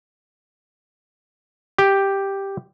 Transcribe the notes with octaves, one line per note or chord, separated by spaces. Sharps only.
G4